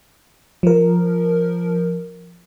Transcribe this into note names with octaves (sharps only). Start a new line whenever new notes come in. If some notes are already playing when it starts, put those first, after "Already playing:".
F3 A#4